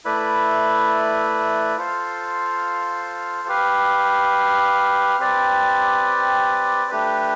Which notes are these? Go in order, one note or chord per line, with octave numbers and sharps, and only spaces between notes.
A3 E4 B4 D5
F4 A4 C5 F5
G4 B4 F5
C4 G4 B4 D5
A3 D4 G4 B4